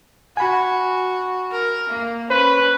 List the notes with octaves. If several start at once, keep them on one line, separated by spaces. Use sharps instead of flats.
F#4 G#5 B5
A#4
A#3
C#4 B4 C5